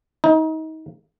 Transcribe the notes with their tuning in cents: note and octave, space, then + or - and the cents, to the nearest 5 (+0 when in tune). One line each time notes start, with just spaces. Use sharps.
D#4 +30